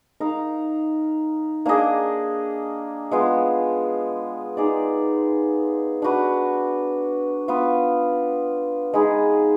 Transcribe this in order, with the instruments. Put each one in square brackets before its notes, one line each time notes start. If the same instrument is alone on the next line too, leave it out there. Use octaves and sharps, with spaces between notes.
[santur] D#4 A#4 F5
A#3 D4 G#4 D#5
G#3 B3 F4
D#4 G#4 D5
D4 F#4 B4
B3 F4 B4
G#3 D#4 G#4 B4